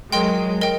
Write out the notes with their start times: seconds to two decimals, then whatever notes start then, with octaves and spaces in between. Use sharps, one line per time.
0.12 F#3 G#3 A#4 D#5 G5 C6
0.61 A#4 D#5 G5